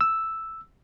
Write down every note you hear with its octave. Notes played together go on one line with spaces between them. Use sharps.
E6